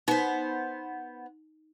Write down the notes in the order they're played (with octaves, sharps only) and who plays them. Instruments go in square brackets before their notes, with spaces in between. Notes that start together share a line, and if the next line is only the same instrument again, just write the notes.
[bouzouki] B3 C5 [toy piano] D#4